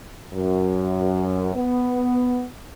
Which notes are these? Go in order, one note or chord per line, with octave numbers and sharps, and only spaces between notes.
F#2
B3